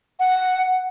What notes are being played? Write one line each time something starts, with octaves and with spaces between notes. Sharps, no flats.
F#5